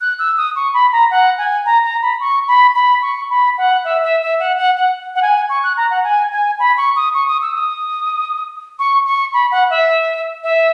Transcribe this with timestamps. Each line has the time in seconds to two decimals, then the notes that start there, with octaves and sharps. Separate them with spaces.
0.01 F#6
0.19 E6
0.37 D#6
0.56 C#6
0.74 B5
0.92 A#5
1.11 F#5
1.38 G#5
1.66 A#5
1.84 A#5
2.02 B5
2.20 C#6
2.48 B5
2.75 B5
3.02 C#6
3.30 B5
3.58 F#5
3.85 E5
4.03 E5
4.22 E5
4.40 F#5
4.58 F#5
4.76 F#5
5.15 F#5
5.22 G#5
5.49 C#6
5.63 F#6
5.77 A#5
5.90 F#5
6.04 G#5
6.32 G#5
6.60 B5
6.77 C#6
6.96 D#6
7.14 C#6
7.28 D#6
7.42 E6
7.55 D#6
8.79 C#6
9.06 C#6
9.34 B5
9.51 F#5
9.70 E5
10.43 E5